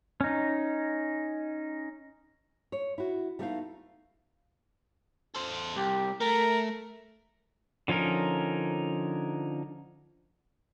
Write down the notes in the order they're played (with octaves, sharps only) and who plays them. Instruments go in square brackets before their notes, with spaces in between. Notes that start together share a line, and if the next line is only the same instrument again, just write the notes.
[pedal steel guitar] C#4 D#4
[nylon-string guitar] C#5
E4 F#4
G3 A3 B3 D#4 E4 F5
[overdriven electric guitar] A4 C5
[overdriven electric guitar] C2 [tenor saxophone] G4
[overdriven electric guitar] A3 [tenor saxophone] A#4
[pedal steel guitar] D3 F3 C#4 D#4 A#4